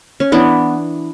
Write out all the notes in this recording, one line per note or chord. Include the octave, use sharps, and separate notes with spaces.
C#4
E3 B3 D4